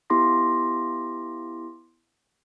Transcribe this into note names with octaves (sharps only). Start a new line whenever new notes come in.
B3 E4 G4 C6 D6 A#6